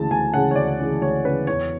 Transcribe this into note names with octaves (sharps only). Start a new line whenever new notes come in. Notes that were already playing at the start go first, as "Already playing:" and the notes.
Already playing: D2 C#3 E3 G#3 A5
D2 G#5
C#3 E3 G#3 F#5
C#5
D2 D5
C#3 E3 G#3
D2 C#5
C#3 E3 G#3 B4
E2 C#5